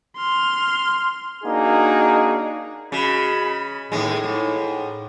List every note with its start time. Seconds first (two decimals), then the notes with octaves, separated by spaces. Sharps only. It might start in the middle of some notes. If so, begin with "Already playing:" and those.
0.17 C6 F6
1.44 A#3 D4 D#4 F#4 G#4
2.92 C#3 G#3 F#4 B5
3.92 D#2 A2 G#3
4.24 G#2